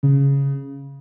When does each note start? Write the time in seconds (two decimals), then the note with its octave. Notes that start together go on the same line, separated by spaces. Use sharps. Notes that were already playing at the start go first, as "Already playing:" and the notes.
0.03 C#3